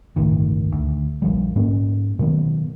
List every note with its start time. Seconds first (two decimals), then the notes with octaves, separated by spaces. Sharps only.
0.16 G1 C#2 A2 D#3
0.72 D2
1.22 A#1 F3 G3
1.56 G#2 A#3 C#4
2.19 B2 D#3 F#3 B3